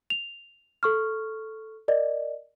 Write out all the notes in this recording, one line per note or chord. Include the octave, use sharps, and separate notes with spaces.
F7
A4 C#6 F6
A#4 D5 D#5